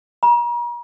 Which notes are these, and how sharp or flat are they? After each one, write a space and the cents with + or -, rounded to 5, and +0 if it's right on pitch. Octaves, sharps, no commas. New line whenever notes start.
A#5 +40